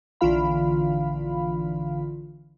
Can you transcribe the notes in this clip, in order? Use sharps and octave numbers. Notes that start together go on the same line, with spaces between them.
A#1 D3 E3 F4 F5 B5